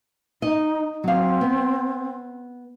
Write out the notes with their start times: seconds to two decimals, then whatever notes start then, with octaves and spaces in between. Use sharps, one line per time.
0.42 D#4 D#5
1.04 F#3 C4 F5
1.41 B3